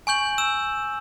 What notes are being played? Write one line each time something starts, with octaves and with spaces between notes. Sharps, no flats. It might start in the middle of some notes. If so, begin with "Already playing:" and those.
G#5 C#6 G6 F#7
E6 E7